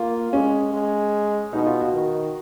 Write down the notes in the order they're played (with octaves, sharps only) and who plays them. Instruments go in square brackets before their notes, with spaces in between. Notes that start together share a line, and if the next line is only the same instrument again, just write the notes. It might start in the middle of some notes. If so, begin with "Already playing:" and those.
Already playing: [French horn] A#3 [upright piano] F4
[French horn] G#3 [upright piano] C#4
[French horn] G#3
[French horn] B2 [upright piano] D#4
[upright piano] F4
F#4
[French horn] D#3